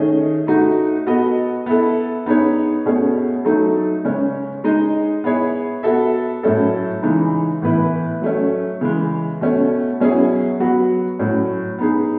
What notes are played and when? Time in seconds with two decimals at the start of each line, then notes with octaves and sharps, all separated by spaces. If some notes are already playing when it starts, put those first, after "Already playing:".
Already playing: D#3 A3 C#4 G#4 D#5
0.47 A3 D#4 F#4
1.06 B3 F#4 A4 D#5
1.66 B3 E4 A4
2.26 B3 D#4 G#4 C#5
2.86 B2 A3 C#4 G#4 C#5
3.45 F#3 A3 D#4 A4
4.05 C#3 G#3 C#4
4.64 G#3 D#4 G#4 D#5
5.24 B3 E4 G#4 C#5
5.83 B3 F#4 A4 E5
6.43 A2 F#3 C#4 E4 A4
7.03 C#3 E3 G#3 D#4
7.62 A2 E3 B3 E4 B4
8.22 F#3 A3 C#4
8.81 C#3 E3 G#3
9.41 B2 A3 C#4
10.00 B2 F#3 C#4 E4 G#4
10.60 F#3 B3 F#4
11.19 A2 F#3 C#4
11.78 B3 D#4 G#4